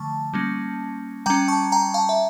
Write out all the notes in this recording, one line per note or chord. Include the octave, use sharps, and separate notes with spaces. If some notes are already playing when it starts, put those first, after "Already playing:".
Already playing: D3 F3 A3 A5 C#6
G3 A#3 C#4
G3 C#4 G5 A#5
A5 C#6
G5 A#5
F5 A5
E5